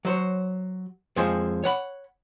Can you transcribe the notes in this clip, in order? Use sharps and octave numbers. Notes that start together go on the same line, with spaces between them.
F#3 C5 C#5
F2 F3 G#3 G#4 C5
C#5 F#5 B5